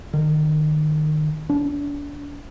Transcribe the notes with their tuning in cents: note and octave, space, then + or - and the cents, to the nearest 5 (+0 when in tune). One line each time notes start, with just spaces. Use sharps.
D#3 -30
D4 -35